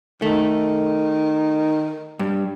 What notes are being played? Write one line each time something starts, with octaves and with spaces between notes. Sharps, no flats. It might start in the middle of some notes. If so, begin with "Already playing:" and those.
D#3 A3
G2